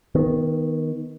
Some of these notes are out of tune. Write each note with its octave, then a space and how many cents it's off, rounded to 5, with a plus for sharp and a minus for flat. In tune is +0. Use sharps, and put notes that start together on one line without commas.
D#3 +15 B3 -10